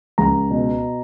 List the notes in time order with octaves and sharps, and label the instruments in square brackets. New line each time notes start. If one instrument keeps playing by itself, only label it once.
[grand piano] C#2 A#5
B2